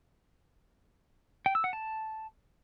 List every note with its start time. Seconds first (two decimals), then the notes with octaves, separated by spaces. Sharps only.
1.46 G5
1.55 E6
1.64 F#5
1.73 A5